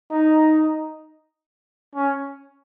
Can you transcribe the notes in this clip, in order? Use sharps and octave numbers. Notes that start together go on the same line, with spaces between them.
D#4
C#4